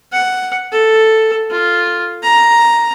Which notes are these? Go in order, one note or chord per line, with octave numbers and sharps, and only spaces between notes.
F#5
A4
F4
A#5